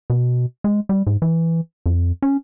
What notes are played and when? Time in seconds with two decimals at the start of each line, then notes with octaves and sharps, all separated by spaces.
0.10 B2
0.64 G#3
0.89 G3
1.07 G#2
1.22 E3
1.86 F2
2.22 C#4